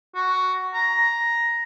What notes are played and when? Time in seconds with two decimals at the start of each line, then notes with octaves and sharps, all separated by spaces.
0.15 F#4
0.74 A#5